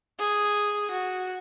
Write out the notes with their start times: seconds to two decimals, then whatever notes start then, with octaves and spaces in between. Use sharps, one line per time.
0.19 G#4
0.91 F#4